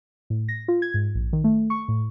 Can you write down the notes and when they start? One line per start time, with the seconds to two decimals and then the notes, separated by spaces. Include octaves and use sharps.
0.30 A2
0.49 A#6
0.68 F4
0.82 G#6
0.94 G#2
1.15 A#1
1.33 D#3
1.44 A3
1.70 C#6
1.88 A2